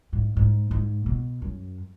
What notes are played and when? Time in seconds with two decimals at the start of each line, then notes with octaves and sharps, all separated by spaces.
0.13 G#2
0.37 G#2
0.71 G#2
1.06 B2
1.42 F#2